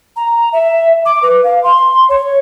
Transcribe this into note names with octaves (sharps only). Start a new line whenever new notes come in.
A#5
E5
D6
B4
F5
C6
C#5